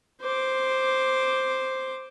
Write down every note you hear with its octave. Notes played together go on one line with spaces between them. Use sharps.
C5 D6